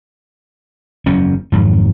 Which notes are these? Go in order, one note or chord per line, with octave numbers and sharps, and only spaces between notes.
F#1 E2 F#3 C#4
G#1 F2 G#2 F#3